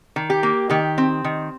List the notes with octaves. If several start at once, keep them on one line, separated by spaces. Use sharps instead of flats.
D#3
G4
A#3
D#3 G4
C4
D#3